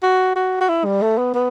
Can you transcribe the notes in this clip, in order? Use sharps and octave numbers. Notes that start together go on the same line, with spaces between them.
F#4
F#4
F#4
E4
G3
A3
B3
B3